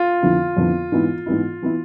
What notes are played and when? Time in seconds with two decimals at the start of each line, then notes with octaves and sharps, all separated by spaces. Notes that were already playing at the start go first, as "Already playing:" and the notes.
Already playing: F4
0.22 F2 D3 F3 B3 E4
0.57 F2 D3 F3 B3 E4
0.92 G#2 E3 B3 E4
1.26 G#2 E3 B3 E4
1.62 E3 B3 E4